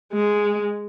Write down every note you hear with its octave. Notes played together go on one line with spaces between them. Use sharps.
G#3